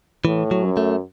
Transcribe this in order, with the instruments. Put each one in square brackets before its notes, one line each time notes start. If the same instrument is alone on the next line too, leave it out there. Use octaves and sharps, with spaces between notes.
[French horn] A2 [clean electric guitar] E3
[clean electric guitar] F#3
[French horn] F#2
[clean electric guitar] A3